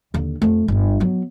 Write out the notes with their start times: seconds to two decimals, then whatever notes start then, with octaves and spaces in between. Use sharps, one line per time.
0.14 D#2 D3
0.42 F2 A3
0.68 G1 C#3
1.00 F#3 B3